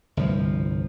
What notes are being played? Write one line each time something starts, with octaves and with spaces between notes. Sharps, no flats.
G1 C2 F3